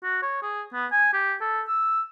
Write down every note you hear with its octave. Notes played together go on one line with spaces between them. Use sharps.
F#4
C#5
G#4
B3
G#5
G4
A4
E6